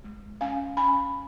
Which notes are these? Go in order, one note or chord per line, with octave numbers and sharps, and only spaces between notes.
G#3
C#4 F5 G#5
C#4 G#5 B5